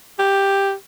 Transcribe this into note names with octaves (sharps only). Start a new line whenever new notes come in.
G4